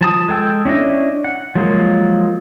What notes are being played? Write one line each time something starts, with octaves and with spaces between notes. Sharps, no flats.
F3 A5 D#6
G#3 A4 G5 E6
C#4 D4 E4 D#5
F#5
F3 F#3 G#3 A#3